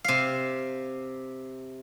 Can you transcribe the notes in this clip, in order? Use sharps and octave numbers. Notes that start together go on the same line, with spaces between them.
C3 F5